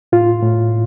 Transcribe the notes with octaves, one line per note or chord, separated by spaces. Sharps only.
A2 F4
A2